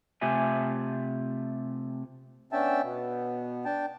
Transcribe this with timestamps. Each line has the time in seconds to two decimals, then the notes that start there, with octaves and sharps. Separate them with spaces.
0.21 C3 A3 F4 G4 E5 G#5
2.53 B3 C#4 D4 E5 G5 A5
2.83 B2 B3
3.65 D4 G5 A5